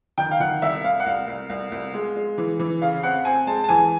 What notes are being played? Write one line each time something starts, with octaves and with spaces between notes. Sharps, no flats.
D#3 G5
F5
D#3 F#5
C2 E5
C2 F5
F#5
C2 F5
C2
C2
C2
G#3
G#3
E3
E3
C#3 F5
C4 F#5
C4 G#5
G#3 A5
A5
E3 G#5